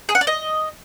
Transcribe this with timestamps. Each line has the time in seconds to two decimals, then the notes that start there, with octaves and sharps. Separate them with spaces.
0.09 G#4
0.15 F#5
0.21 D5
0.27 D#5